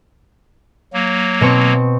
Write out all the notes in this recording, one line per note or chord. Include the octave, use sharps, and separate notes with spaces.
F#3 A#3
B2 C4 C#6